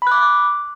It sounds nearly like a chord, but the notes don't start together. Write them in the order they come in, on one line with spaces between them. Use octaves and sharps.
B5 F#6 D6